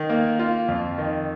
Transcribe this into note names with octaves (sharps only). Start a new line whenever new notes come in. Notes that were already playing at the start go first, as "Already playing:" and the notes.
Already playing: D#3
A#3
F4
F2
D#3